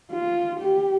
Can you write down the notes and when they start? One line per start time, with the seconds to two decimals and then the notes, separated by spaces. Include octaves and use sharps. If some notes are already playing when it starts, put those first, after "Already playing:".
0.11 F4
0.59 G4